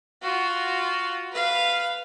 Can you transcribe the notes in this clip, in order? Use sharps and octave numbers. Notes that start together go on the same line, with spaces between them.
F4 F#4
B4 F5